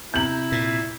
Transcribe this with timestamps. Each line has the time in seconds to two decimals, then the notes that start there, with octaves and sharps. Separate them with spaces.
0.14 C3 E4 A#5 G6 F#7
0.52 A#2